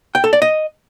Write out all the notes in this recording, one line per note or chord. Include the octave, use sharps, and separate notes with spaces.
G5
A4
D5
D#5